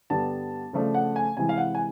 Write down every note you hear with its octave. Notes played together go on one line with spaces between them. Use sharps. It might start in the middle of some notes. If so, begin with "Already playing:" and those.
G2 D3 G3 B3 D4 A5
C#3 F3 A3 D4
F#5
G#5
C3 E3 G#3 G#5
F5
F#5
G#5